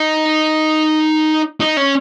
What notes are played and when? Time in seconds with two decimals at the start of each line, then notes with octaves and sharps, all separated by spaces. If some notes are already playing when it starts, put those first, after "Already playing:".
Already playing: D#4
1.60 D#4
1.77 C#4